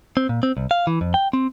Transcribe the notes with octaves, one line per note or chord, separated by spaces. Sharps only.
C4
A#2
C4
C2
F5
E3
F2
G5
C4